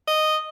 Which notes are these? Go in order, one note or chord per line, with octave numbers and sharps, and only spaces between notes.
D#5